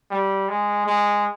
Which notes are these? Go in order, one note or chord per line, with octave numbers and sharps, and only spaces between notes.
G3
G#3
G#3